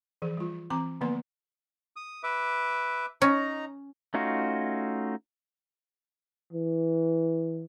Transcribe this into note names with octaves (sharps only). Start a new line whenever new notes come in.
E3 F3 G#4
G3 F4
E3 C4 A#5 D6
D3 F3 A#3 B3 B4 C6
D#6
B4 E5 D6
C#4 D#4 A#5
A3 C#4 D#4 F4 F#4
E3